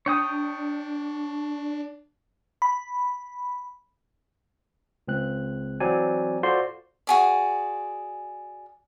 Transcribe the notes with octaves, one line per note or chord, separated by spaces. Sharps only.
D4 C#5 G5 D#6
B5
C#2 C4 F#6
E3 F#3 C4 D5 G#5
F4 F#4 A4 C5 D5 C6
F#4 G#4 D5